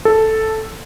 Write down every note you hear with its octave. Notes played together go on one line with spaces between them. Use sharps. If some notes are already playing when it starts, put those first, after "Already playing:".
A4